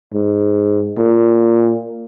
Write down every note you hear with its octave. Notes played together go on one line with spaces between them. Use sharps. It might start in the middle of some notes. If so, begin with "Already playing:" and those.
G#2
A#2